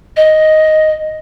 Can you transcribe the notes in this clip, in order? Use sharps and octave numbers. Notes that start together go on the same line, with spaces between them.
D#5